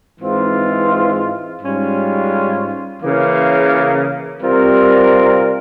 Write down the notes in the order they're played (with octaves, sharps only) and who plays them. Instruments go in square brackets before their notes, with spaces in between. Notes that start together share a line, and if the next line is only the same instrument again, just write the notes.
[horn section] G#2 E3 G#3 C4 F4
G#2 G3 C#4 F4
C#3 E3 A#3
C3 G3 C4 F4 A#4